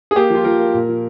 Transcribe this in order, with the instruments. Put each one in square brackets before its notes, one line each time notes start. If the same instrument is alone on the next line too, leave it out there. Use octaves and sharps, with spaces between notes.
[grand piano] G#4
A#3 G4
F3 F4
F3 A#4
A#3
A#2
F3